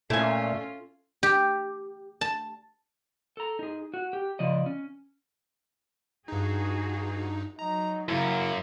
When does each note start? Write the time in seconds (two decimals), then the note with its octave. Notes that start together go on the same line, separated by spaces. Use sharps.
0.10 A#2 A3 C#4 E4 F4 G#5
1.23 G4
2.21 A5
3.37 A4 A#5
3.59 D#4 G#4
3.94 F#4
4.13 G4
4.39 C#3 F3 D5 D#5
4.66 C#4
6.28 G2 D#4 F4 F#4 G#4
7.59 F#3 D#4 A#5
8.08 F#2 C#3 A#3 E4